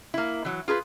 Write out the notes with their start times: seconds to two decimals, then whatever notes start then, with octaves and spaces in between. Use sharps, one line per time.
0.14 A#3 E4
0.45 E3 F#3
0.68 F4 G#4 A#4 B4